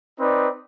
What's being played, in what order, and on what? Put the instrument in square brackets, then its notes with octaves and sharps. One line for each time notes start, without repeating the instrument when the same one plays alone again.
[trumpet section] C4 D#4 B4 D5